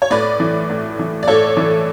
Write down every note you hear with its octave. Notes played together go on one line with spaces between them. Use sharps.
C#5
A2 B4 D5
E3
A2
E3
D5
A2 A4 C#5
E3